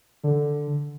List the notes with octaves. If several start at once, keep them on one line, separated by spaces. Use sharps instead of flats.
D3